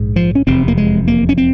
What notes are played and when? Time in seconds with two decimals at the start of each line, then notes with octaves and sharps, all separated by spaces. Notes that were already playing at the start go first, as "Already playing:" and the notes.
Already playing: A#1 G#2
0.16 F3
0.35 C#4
0.47 F1 E2 C3 C4
0.68 A#3
0.77 G#3
1.08 A#3
1.29 C#4
1.38 C4